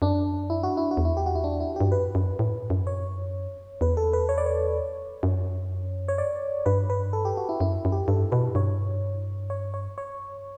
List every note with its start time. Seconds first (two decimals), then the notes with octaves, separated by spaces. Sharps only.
0.02 F#2 D4
0.50 E4
0.63 F#4
0.77 E4
0.91 F#4
0.97 E2
1.05 E4
1.17 G4
1.26 F#4
1.35 E4
1.44 D4
1.60 E4
1.76 G2 G4
1.92 F#2 B4
2.15 F#2
2.39 A2
2.70 F#2
2.87 C#5
3.81 E2 B4
3.97 A4
4.13 B4
4.29 C#5
4.38 D5
4.46 C#5
5.23 F#2
6.08 C#5
6.18 D5
6.66 G2 B4
6.90 B4
7.13 A4
7.25 G4
7.37 F#4
7.49 E4
7.60 F#2 E4
7.85 F#2
7.92 G4
8.08 G2 A4
8.32 B2 B4
8.55 G2 C#5
9.50 C#5
9.74 C#5
9.98 C#5